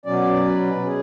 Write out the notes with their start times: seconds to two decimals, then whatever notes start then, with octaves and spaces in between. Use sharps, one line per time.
0.06 B2 F#3 C#4 D5
0.45 B4
0.86 C#4 G#4